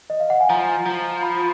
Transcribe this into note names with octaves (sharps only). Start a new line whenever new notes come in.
D#5
F5
F#5
G#5
F3 A#5
F3 A#5
B5